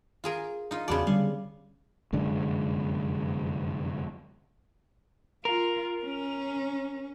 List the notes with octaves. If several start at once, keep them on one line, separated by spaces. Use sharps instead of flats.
F4 G#4 A#4
D#4 F4
E2 C#3 B3 F#4 D5 A5
D3 G3 F5
F1 F#2 D3 G#3
F4 A#4
C#4